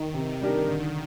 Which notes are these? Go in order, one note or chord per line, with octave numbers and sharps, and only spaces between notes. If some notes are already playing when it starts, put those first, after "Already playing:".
Already playing: D#3
C3
G3 D4 G4 A#4
D3